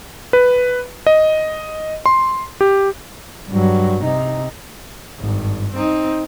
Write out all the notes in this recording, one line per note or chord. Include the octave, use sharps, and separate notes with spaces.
B4
D#5
C6
G4
G2 F#3
C3 D#4
G#1 G2
C4 D#4